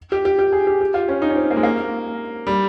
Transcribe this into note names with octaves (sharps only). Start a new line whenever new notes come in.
G4
G4
G4
G#4
G4
G4
F4
C#4
D#4
C#4
C4
A#3
G#3
A#3
G3